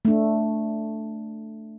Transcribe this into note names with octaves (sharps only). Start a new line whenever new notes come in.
A3 D4